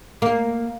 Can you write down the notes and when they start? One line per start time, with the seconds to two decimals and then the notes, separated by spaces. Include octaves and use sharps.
0.22 A#3